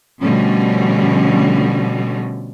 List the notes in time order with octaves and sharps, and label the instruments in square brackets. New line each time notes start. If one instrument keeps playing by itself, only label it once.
[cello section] B2 D3 F3 G3 A3 C#4